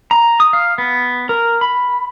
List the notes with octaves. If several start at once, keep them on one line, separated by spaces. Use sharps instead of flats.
A#5
D#6
F5
B3
A#4
B5